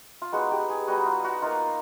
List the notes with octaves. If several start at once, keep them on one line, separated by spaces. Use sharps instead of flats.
F4
G#3 B3 D#4 F#4
G4
G#4
G3 B3 D#4 F#4
F4
F#4
A#3 D#4 F4